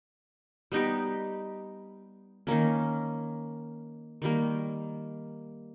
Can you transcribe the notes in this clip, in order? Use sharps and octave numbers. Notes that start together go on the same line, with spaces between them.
G3 B3 D#4 G4
D#3 A#3 C#4
D#3 G3 A#3